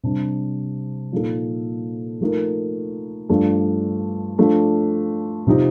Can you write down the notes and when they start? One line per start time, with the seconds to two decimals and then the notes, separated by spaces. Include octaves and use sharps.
0.03 C3 G3 D4
1.12 A#2 F3 A#3 D#4 A4
2.21 F3 A3 D#4 A#4
3.29 G2 F3 A3 D4
4.38 F3 A3 D4
5.47 C3 F3 C4 D#4 G4